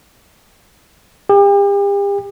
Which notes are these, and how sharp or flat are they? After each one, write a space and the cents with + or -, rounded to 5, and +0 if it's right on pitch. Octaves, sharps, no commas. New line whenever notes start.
G4 +40